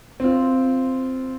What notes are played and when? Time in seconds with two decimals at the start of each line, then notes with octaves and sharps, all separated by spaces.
0.20 C4 F4